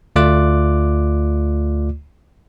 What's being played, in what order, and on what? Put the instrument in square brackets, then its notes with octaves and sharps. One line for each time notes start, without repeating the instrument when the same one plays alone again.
[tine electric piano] D2 A3 F4 D5 D6 F#6